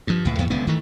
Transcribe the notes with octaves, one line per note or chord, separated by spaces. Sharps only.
G2 F3
C#2 A2
E2 A2 B3
D1 C#2 D3 B3
D#3 E3 A3